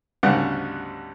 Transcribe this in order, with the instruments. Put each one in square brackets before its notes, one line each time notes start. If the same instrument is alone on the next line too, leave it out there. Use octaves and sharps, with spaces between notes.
[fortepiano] D2 G#2 C#3 G3 B3 F#5